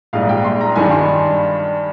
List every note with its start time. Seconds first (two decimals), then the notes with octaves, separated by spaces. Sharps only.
0.13 A#1 G#2 G3 F5
0.29 G5
0.44 C6
0.61 A#5
0.76 G2 D#3 G3 D4 G#5
0.91 C6